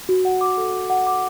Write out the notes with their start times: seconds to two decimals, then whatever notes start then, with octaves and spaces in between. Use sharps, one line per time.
0.09 F#4
0.25 F#5
0.41 D6
0.57 A4
0.74 F#4
0.90 F#5
1.07 D6